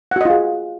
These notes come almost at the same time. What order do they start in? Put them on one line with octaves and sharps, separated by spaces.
F#5 F#4 D#5 F4 G#4